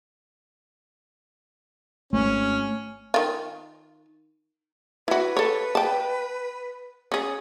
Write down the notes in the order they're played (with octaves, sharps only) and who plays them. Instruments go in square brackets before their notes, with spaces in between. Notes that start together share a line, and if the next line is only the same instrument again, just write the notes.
[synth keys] G#1 [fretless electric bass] A3 [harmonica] C#4
[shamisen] D#3 F4
[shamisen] E4 F#4 [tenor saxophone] B4
[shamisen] A4 C#5
G5 A5
C#4 G#4